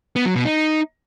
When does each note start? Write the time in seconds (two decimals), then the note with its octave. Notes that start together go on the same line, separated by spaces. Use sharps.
0.16 B3
0.26 F#3
0.35 B2
0.45 D#4